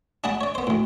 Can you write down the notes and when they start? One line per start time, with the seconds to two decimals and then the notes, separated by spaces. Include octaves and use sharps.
0.24 D4 G#4 F#5 A5 B5
0.41 C#5 D5
0.55 B3 C5
0.67 D2 A2